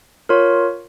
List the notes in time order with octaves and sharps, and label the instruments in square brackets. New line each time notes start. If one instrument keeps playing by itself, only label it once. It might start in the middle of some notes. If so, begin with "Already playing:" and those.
[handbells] F4 A#4 C#5